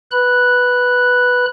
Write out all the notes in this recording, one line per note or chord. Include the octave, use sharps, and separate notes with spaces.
B4 B5 F#6